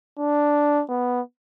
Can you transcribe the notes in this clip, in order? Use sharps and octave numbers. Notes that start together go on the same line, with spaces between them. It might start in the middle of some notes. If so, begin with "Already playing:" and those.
D4
B3